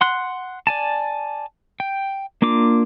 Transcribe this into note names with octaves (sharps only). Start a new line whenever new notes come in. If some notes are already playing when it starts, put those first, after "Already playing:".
F#5 C6 F#6
D5 G#5 A5
G5
A#3 D4 F4 D6